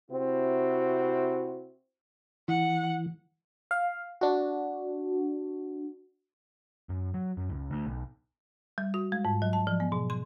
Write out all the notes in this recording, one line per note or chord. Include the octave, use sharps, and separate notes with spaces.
C3 C4 E4 F#4
E3 F#5
F5
D4 F#4
F#2
F#3
F#2
C#2
D2
B1
G3
F#4
G#3
G#2
F#3
A5
F3
B3
B2
C6